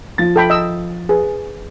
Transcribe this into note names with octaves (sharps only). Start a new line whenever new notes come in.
F3 A6
A4 G5 B5
D#5 E6
G#4 B4